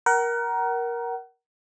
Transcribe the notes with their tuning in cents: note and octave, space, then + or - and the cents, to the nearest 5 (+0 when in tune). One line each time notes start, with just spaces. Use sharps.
A#4 +15 F#5 +35